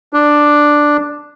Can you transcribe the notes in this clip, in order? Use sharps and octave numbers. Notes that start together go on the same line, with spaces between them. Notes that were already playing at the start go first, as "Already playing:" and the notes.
D4